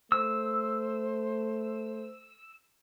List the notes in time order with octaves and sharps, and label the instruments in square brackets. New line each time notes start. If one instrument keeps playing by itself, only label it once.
[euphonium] A3 [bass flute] C5 [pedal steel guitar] E6